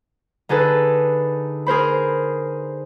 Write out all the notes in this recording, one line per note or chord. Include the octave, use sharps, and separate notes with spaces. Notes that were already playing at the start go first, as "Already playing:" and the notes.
D3 D#4 G#4 A4 B4
G#4 A#4 C5 B5